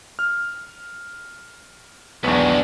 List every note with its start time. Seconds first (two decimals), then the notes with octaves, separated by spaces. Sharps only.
0.19 F6
2.24 B1 E2 B3 D4